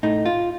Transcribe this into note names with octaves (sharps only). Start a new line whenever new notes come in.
A2 A3 D#4
F4